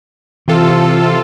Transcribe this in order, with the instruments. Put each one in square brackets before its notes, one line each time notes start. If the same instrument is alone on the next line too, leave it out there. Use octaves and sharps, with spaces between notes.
[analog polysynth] C3 F4 A4 [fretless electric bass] E3